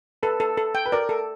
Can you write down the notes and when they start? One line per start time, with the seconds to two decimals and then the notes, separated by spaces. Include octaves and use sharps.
0.23 A4 B4
0.40 A4
0.57 A4
0.75 G5
0.86 B4
0.92 A#4 D5
1.09 A4